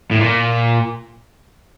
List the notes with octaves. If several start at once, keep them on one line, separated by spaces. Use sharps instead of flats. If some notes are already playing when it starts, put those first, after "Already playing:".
A2
A#2